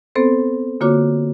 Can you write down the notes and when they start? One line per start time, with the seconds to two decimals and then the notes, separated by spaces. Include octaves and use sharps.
0.16 B3 C4 A4 C5
0.81 D3 A#3 F4 F#4 C#5 D6